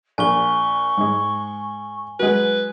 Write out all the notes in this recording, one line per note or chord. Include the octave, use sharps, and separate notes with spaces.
A#1 G#5 C#6 G7
G#2 G#3
F#3 G#3 B4